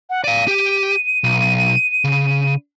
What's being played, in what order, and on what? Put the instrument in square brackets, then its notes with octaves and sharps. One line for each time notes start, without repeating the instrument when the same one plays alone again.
[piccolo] F#5
[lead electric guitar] D5 F5 [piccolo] D#7
[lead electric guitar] G4
B1
C#3